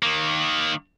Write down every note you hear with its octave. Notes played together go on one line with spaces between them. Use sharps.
D#3 A#3